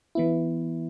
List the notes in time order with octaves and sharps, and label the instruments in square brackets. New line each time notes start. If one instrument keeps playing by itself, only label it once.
[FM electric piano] E3 B3 E4